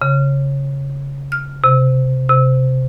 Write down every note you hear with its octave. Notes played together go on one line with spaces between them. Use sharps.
C#3
F6
C3
C3